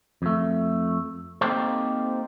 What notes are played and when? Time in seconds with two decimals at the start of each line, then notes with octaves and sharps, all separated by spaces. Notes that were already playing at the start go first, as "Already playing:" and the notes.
0.22 F2 A3
1.41 A#3 C4 D#4 G4 A4 C5